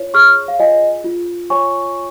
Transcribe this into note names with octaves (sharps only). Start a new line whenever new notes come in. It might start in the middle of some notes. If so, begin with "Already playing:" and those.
Already playing: F4 C#5
G#4 C#6 F6
F5
F4 D#5 G#5
F4
C#5 G#5 C#6